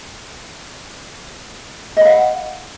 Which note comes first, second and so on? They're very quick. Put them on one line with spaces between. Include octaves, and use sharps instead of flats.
D#5 B5 F5 F#5